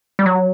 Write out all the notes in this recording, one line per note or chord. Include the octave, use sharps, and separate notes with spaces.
G3
F#3